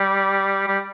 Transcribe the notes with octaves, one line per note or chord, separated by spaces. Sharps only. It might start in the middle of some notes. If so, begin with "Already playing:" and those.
Already playing: G3
G3